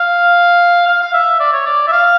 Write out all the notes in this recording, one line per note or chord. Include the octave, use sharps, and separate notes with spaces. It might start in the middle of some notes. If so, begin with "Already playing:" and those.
Already playing: F5
F5
F5
E5
D5
C#5
D5
E5
F5